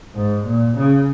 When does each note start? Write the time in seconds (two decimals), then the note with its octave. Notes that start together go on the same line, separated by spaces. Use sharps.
0.15 G#2
0.46 A#2
0.76 C#3